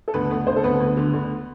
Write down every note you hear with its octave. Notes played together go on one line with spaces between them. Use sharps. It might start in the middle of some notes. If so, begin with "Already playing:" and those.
A4
D2 B3 B4
D2 B3 B4
D2 C4 C5
A4
D2 B3 B4
D2
D3
D2